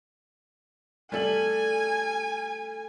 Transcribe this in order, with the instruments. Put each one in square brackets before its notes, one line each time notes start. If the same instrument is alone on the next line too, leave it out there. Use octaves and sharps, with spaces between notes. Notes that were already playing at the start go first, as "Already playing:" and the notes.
[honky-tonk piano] G3 A4 F#7 [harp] A3 [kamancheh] G#5